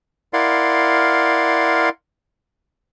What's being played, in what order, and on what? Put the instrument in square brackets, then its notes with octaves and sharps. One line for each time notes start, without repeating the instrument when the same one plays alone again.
[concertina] E4 A#4 D5 F5 F#5 C6